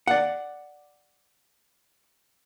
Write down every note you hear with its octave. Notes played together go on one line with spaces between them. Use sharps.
D5 F#5